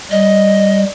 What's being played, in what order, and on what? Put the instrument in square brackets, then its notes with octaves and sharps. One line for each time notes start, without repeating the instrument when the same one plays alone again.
[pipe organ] G3 [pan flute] D#5